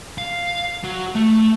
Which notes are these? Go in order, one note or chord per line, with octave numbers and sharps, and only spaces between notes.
F5
F#3
A3